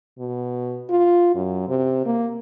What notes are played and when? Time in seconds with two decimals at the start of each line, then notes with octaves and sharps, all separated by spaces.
0.19 B2
0.90 F4
1.35 F#2
1.68 C3
2.06 A#3